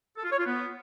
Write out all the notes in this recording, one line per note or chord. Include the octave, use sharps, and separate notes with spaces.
A4
F4
C#5
F4
B3